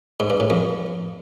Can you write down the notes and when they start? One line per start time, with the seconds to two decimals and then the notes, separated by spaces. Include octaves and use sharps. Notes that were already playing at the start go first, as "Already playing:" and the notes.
0.20 G#2
0.30 G2
0.40 A2
0.50 F2